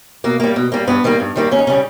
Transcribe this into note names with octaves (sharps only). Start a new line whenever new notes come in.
B2 A#3
G3 A#3
B2
G3 A#3
G2 B3
D#3 G3 A#3
G2
D#3 G3 A#3
D#2 C#4
D#4
C#3 G3 C#4